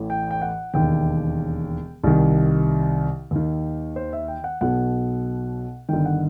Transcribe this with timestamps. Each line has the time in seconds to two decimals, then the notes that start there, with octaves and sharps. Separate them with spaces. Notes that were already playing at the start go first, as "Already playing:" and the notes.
Already playing: A1 A2 E3
0.10 G5
0.31 G5
0.42 F#5
0.74 E1 D#2 D#3 G5
2.04 C2 C3 D#3
3.31 D#2 D#3
3.96 C5
4.13 E5
4.28 G5
4.44 F#5
4.61 B1 B2 F#5
5.89 G1 G2 D#3 G5
6.05 F#5